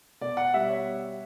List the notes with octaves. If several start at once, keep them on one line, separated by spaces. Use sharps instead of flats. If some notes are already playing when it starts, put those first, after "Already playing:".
B2 D5
F#5
G3 E5
C#5